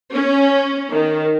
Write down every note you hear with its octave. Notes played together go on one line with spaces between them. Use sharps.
C#4
D#3